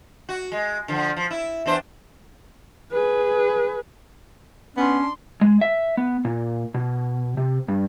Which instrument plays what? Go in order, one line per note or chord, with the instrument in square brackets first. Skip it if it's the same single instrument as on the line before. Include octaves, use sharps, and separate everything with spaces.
[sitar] F#4
G#3
D3 F3
F3
E4
E2 D4 C5
[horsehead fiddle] G#4 B4
[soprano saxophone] B3 [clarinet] C#4 [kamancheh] D4 C6
[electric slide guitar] G#3
E5
B3
A#2
B2
C3
G2